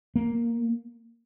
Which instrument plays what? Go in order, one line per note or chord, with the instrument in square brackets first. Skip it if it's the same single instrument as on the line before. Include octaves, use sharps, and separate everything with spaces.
[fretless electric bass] A#3